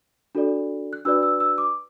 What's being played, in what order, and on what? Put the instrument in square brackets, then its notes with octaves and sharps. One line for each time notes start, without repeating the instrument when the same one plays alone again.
[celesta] D4 F#4 A4 D5
F#6
D4 F#4 B4 D5 E6
E6
E6
D6